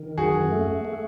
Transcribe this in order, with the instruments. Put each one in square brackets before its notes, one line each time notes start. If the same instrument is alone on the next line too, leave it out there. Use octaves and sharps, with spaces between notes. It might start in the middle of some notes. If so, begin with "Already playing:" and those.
Already playing: [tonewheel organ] D#3
[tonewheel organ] F#2 [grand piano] F#4 G#4
[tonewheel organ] A3
A3